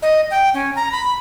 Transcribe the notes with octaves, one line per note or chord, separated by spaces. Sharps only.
D#5
G5
C#4
A#5
B5